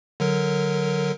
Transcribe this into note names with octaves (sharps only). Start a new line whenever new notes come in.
D3 F#3 A#4